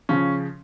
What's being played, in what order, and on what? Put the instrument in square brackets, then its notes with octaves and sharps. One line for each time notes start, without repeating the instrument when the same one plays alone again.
[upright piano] C#3 F3 C#4